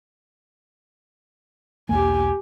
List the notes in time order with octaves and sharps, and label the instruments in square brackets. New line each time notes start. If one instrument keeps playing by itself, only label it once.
[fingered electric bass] B1 E2 A#3 [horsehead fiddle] G4 G#5